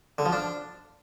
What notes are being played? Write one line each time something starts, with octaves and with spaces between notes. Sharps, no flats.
D3
F3
D4